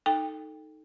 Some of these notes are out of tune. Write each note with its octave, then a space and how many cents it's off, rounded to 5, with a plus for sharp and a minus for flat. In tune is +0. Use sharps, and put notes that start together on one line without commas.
D#4 +0 A4 +0 G5 +20